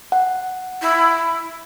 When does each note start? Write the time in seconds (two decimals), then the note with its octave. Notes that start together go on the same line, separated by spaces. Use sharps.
0.12 F#5
0.82 E4